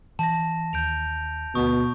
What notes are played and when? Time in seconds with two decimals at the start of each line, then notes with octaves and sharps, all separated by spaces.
0.19 E3 A5 A#6
0.73 D#2 G6 D7 F7
1.55 D2 B2 C#6 D#6